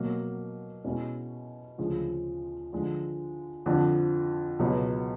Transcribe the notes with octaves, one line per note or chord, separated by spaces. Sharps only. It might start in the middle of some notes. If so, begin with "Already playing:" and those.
Already playing: B2 F#3 A#3
B2 G#3 C#4 E4
D2 C#3 F3 G#3
D3 F3 G#3
F2 D3 F3
C#2 B2 F#3 B3